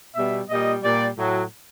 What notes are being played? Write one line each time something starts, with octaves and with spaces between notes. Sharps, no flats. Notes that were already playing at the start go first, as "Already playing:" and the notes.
B2 G3 E5
A#2 G3 D#5
A#2 G3 D5
A2 F#3